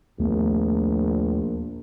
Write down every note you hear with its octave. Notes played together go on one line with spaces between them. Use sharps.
A#1 D#2 A3 B3